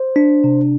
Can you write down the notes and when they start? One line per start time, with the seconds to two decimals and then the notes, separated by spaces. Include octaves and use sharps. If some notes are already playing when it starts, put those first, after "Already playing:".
Already playing: C5
0.16 D4
0.44 C3